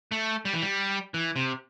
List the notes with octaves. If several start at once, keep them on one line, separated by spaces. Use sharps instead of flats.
A3
G3
E3
G3
E3
C3